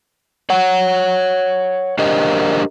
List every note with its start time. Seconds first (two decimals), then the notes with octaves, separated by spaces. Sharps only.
0.50 C#5 F#5
1.99 D4 G4 A#4 C5 D#5